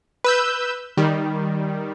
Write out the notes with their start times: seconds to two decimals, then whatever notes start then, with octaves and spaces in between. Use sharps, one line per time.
0.24 B4 E6 G6
0.97 D#3 G3